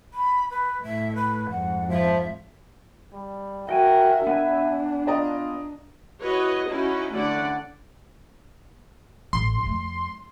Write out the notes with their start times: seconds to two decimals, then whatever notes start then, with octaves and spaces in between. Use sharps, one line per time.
0.14 B5
0.51 B4
0.83 A2 E5
1.16 B4
1.49 F2 G#2 F#5
1.89 F3 E5
3.13 G3
3.69 F#4 A#4 D#5 E5 G5 G#5
4.27 B3 D4 B4 G#5
5.07 F4 D5 D#5 A#5
6.22 E4 F#4 B4 C#5 D#5
6.69 C#4 D#4 E4 F#4
7.14 D3 A3 C#4 E4 D5 F#5
9.33 A1 C6
9.63 F2 A3